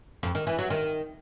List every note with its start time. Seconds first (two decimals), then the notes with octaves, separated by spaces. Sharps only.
0.23 F2
0.35 D#3
0.47 E3
0.59 F#3
0.70 D#3